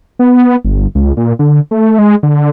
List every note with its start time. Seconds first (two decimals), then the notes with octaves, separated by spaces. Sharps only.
0.19 B3
0.65 G1
0.95 C#2
1.17 A#2
1.39 D3
1.71 A3
1.98 G#3
2.23 D3